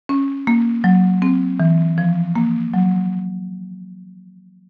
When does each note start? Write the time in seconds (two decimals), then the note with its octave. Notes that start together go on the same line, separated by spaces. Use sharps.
0.09 C#4
0.47 A#3
0.84 F#3
1.22 C4
1.60 E3
1.98 F3
2.36 A#3
2.74 F#3